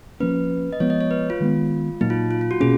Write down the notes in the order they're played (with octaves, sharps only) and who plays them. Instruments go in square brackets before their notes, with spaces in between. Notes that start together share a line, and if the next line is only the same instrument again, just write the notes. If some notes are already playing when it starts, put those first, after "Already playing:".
[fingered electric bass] F3 A#3 C#4 [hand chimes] B4
[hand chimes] D#5
[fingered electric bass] F3 G#3 B3 [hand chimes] C#5
[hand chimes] D#5
C#5
B4
F4
[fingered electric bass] D#3 G#3 B3
[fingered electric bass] A#2 F#3 A#3 [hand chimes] D#4
[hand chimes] F4
F4
F4
F#4
[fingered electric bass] B2 A#3 C#4 [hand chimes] G#4